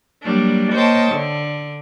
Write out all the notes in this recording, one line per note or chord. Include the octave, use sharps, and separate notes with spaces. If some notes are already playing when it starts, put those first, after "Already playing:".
F#3 G3 A#3 D4
A#3 C5 C#5 D#5 G5 A5
D3